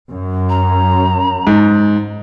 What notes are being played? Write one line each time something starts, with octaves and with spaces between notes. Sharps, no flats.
F#2
A#5
G#2